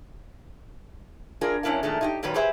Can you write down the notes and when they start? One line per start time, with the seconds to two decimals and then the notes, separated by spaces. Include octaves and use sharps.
1.41 D4 F4 G#4 A#4
1.63 F#2 C#4 D4 E4 A#4 F5
1.83 A#2 D#3 G#3 A3
2.01 D#4 F4 G4
2.23 A#2 D#3 F#3 G3 B4
2.34 G4 G#4 B4 C5 E5